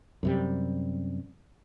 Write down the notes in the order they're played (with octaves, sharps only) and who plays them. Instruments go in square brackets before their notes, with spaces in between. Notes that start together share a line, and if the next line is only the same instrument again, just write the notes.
[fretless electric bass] F#2 C3 G3